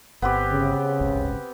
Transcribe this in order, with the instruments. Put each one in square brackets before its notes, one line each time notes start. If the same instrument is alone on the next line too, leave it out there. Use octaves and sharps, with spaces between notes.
[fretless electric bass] G1 [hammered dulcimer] B3 C4 G4
[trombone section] C#3
[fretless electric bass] D1 G1 C#2